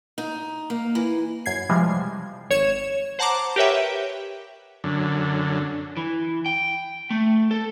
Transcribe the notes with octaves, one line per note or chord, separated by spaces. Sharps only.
D#4
A#3
E3
F#2 G#6 C7
C3 E3 F3 G3 G#3
G#1 C#5 G#6 E7
C5 F#5 A5 A#5 C6 D6
G4 A#4 B4 C#5 E5 G5
F#2 D3
E3
G5
A3
A4